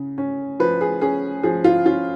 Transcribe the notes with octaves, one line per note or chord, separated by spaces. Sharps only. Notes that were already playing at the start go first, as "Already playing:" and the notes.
Already playing: C#3 C#4
C#4
F3 B4
G#4
C#4 G#4
F3 G#4
F4
C#4 F4